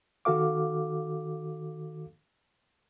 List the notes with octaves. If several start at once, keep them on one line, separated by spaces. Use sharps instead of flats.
D#3 F#4 A4 F5 D6